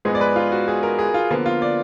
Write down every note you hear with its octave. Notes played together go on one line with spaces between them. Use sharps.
G#2 F3 G#3 B3 D#4 G#4
D5
B4
F4
F#4
G#4
A#4
G#4
F4
D3 F3 A#3 B3
F4
D5